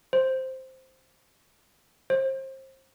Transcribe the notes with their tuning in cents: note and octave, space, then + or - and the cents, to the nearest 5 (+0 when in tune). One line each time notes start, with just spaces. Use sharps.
C5 +0
C5 +30